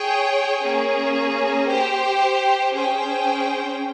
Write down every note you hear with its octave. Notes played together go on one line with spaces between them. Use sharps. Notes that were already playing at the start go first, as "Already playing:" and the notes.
Already playing: G#4 C#5 G5
A#3 C#4 G#4
G4 C5 G5
C#4 G#4 C5 G5